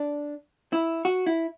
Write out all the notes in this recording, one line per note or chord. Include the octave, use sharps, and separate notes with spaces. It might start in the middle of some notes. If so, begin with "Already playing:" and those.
Already playing: D4
E4
F#4
E4